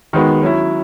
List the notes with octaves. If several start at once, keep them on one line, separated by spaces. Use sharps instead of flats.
D#3 G#3 B3 F#4
F#3 C#4 E4